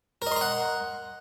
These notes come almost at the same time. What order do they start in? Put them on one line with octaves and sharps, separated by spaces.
A#4 D#5 C6 A#5 F#5